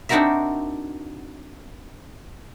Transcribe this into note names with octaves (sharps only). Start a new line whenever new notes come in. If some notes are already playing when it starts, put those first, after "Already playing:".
C4 D4 D#4 F#4 A#4 E5